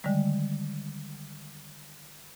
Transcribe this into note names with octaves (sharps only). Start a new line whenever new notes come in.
D3 D#3 G3 G#3